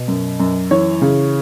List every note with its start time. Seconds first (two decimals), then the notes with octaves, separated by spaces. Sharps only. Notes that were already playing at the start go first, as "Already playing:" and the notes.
Already playing: B2
0.08 F#2
0.40 F#2
0.71 E3 C#5
1.02 C#3